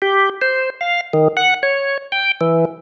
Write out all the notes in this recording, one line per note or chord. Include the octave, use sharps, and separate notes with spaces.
G4
C5
F5
D#3
F#5
C#5
G5
E3